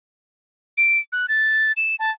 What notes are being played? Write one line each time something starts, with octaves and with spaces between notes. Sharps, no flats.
D7
F#6
A6
E7
A5